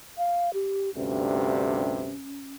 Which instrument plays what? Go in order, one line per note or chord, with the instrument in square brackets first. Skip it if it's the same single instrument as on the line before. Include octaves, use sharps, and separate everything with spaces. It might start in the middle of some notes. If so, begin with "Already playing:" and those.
[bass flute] F5
G4
[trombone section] D2 G2 C3 [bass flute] C#4